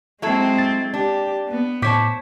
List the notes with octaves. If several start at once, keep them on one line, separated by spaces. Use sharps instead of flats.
F#3 G#3 C4 E4 A4
A6
D4 G4
B3
A2 C5 C#5 A5 D6 B6